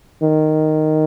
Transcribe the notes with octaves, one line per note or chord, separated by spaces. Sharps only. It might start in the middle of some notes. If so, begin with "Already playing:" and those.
D#3